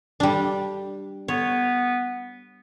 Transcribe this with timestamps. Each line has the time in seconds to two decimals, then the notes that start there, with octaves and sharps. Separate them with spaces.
0.20 G3 D4
1.28 B3 C#5